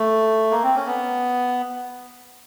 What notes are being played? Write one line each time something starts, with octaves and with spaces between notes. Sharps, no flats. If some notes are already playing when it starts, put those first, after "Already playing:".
Already playing: A3
A#3
C4
C#4
B3